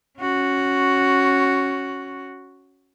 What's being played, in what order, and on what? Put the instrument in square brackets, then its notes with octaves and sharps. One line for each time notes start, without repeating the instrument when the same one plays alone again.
[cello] C#4 F#4